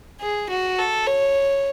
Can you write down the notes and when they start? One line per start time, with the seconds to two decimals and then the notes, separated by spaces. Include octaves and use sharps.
0.20 G#4
0.49 F#4
0.78 A4
1.07 C#5